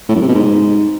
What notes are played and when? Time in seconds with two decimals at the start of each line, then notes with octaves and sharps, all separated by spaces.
0.09 A2
0.15 F#2
0.22 C3
0.28 B2
0.35 G#2